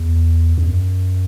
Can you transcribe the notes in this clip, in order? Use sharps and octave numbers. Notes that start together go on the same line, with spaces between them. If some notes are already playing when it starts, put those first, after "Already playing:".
Already playing: E2
E2
F#2